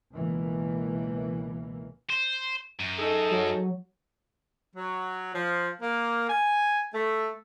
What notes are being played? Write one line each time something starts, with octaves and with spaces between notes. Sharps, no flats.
C#2 B2 E3 A#3
C5
F#2
D#4 G#4 A4
F#3
F#3
F3
A#3
G#5
A3